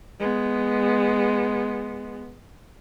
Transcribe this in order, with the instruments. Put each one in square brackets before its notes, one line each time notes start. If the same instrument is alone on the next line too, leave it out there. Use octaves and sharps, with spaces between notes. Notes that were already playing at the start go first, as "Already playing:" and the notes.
[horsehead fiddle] G#3 B3